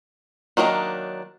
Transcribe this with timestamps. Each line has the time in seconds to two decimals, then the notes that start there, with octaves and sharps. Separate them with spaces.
0.57 D#3 F#3 A#3 D4 D#4